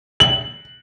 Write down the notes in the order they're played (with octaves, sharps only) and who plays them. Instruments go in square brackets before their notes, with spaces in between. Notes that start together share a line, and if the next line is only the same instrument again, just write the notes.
[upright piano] F#7